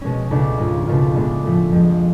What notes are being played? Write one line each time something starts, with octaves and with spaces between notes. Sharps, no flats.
B2 G#3 C#4
C#2 B2 A3 D4
G#2 G#3 C#4 F4
C#2 B2 A3 D4 F4
A2 G#3 B3 D4
A2 F3 A3
F2 F3 G#3